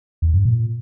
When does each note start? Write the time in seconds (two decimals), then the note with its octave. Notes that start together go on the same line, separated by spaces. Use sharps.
0.22 E2
0.34 G2
0.45 A#2